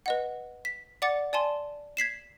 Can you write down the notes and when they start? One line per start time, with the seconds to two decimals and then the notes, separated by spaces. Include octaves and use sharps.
0.06 B4 D#5 F#5
0.65 B6
1.02 D5 F#5 D6 A6 C#7
1.33 D5 G#5 A5 C6
1.97 G#6 B6 C7 E7